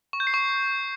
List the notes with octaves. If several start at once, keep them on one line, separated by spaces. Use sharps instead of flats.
C#6
G6
C7
C#6
C7